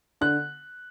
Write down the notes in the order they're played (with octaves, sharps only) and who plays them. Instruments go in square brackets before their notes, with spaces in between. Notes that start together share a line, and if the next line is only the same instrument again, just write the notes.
[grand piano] D3 F#6